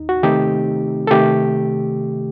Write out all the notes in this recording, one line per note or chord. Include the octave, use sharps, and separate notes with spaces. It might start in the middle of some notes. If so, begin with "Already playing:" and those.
Already playing: D#2 D#4
F#4
C3 D#3 A3 C4 D#4 G4
A4
C3 D#3 A3 G4